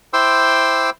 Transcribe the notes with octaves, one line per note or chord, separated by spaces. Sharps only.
E4 C5 G5 C6 D6 E6